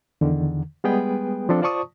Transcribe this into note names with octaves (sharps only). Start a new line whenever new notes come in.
E2 D3 D#3
G3 G#3 B3 G#4 B4 G5
F3 C4 D4 A4
F4 C5 D5 A5 C#6 D#6